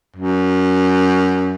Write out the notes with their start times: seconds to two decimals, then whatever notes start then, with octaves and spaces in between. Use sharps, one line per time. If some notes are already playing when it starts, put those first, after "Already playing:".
0.16 F#2